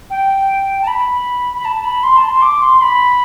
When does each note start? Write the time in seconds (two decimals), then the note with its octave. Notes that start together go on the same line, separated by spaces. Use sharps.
0.10 G5
0.82 A5
0.87 B5
1.57 B5
1.65 A5
1.84 B5
2.03 C6
2.17 A5
2.29 C6
2.42 D6
2.62 C6
2.81 B5